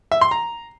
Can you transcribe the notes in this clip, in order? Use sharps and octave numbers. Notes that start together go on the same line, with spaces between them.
E5
C6
A#5